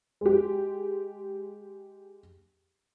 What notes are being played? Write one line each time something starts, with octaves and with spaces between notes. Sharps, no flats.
G#3 G4